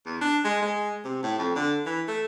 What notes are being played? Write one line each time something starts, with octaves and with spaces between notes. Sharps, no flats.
E2
D4
G#3
G#3
C3
A2
F2
D3
E3
A3